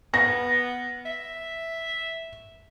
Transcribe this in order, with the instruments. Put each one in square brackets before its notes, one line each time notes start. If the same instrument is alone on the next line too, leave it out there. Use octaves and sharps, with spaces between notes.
[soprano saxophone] B3 [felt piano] A#6
[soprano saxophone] E5